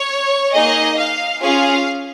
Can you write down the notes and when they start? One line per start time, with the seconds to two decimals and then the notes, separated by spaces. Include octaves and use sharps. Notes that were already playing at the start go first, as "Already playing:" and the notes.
Already playing: C#5
0.53 A#3 D#4 G#4 D#5
0.98 F5
1.42 C#4 F4 G#4 F5